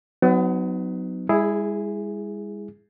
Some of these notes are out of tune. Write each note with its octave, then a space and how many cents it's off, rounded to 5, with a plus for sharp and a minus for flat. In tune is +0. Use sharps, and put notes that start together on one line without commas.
F#3 +0 B3 +35 D#4 +0
G#3 -40 E4 +0 G#4 +0